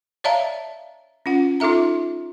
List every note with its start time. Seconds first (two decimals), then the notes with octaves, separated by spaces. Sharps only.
0.24 C#5 D5 E5 F5 A5 A#5
1.26 C#4 F4 F#5
1.60 D#4 F4 A4 E5 A#5